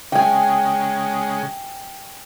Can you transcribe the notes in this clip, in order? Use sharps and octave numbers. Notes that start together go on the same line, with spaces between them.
C#3 G#3 G5 G#5